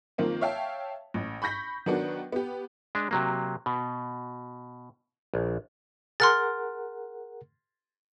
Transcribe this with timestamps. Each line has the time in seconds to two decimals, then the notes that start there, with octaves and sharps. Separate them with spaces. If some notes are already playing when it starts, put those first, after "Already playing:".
0.18 D#3 F3 A#3 C4
0.41 C#5 E5 F5 G5 A5
1.14 A1
1.42 B5 C#6 G6 A#6 B6
1.86 D#3 F#3 B3 D4 F#4
2.32 B3 G4
2.95 G#3 D4
3.11 C3 F#3 A#3
3.66 B2
5.34 A#1
6.20 G#4 A#4 F#5 C6 F6 A6